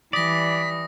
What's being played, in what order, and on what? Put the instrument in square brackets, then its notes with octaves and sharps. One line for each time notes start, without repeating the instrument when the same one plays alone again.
[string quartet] E3 G3 [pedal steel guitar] D5 [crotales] D#6 A#6 [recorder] B6